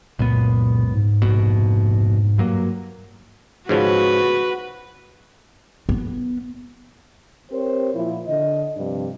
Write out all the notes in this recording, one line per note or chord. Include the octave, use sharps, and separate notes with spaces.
C#2 F#2 A#2 B3
G#2
F1 A#1 B2
G2 F#3 A#3
G#2 C#3 F3 F#4 B4
B3
C4 G4 A#4 C5 C#5
A#2 F3 E4
D3 D#5
G2 C3 F3 D4 D5